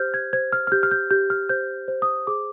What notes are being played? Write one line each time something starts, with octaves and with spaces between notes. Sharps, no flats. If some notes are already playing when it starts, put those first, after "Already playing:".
Already playing: G4 C5 F6 G6
G#6
C5 G#6
F6
F6
G4 G6
F6
G6
G4 G6
F6
C5 G6
C5
D#6
G#4 D6